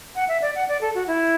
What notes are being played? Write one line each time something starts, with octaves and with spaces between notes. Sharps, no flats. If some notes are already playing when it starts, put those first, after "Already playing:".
F#5
E5
D5
F#5
D5
A4
F#4
E4